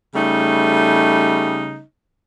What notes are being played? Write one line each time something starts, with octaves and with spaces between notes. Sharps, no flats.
C#3 G3 A3 D#4